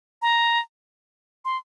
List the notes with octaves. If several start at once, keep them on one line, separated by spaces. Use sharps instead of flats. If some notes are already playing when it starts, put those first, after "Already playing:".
A#5
C6